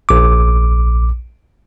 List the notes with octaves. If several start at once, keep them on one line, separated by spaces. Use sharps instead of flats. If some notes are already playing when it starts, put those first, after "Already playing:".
A#1 D6